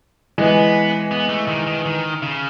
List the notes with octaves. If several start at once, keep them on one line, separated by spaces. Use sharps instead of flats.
E3 G#3 B3
B3
A3
D#3
D#3
D#3
C#3